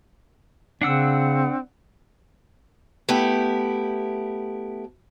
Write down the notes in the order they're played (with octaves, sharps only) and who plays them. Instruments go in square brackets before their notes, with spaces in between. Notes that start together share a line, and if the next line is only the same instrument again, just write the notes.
[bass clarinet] C#3 [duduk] C4 [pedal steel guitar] D4 F#5 E6
[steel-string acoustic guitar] A3 B3 E4 G4